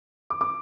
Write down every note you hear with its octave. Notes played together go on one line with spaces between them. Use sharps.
D6
D6